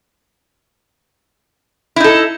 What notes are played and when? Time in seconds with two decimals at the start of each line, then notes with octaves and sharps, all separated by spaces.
1.96 E4
2.00 D#4
2.04 A4